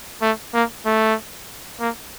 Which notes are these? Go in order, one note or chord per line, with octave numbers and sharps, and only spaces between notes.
A3
A#3
A3
A#3